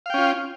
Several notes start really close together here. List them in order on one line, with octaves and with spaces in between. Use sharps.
F5 G5 C#4 F4